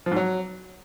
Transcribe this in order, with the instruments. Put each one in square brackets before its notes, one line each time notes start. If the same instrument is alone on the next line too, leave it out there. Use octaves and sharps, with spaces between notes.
[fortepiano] F3
G#2
F#3